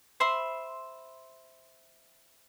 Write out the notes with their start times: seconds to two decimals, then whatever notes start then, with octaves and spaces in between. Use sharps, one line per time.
0.20 C5 E5 B5 C6